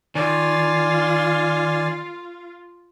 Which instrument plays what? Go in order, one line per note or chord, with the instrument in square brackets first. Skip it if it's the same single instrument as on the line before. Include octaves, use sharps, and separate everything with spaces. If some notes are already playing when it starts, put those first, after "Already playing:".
[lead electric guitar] D#3 [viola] F4 [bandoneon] D5 G#5